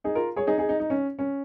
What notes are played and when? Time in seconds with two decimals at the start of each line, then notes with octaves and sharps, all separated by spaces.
0.04 D#4 G#4
0.15 F4 A#4
0.36 G#4 C#5
0.47 D#4 G#4
0.58 D#4 G#4
0.69 D#4
0.80 D#4
0.90 C#4
1.19 C#4